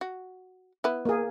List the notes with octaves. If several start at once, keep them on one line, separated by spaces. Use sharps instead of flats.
F#4
B3 E4
A#3 G#4